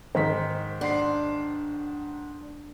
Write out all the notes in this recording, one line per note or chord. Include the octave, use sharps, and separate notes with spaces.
G#2 D#3 C5 B6
D4 F#5 C6 C7